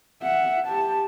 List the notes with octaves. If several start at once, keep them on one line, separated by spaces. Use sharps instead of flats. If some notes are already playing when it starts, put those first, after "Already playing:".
E5 F#5
G4 A5